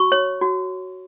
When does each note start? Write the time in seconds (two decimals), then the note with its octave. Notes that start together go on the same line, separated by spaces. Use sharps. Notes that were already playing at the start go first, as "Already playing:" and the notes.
Already playing: F#4 C#6
0.12 C#5
0.41 F#4